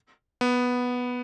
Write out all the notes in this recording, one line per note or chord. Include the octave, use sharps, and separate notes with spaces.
B3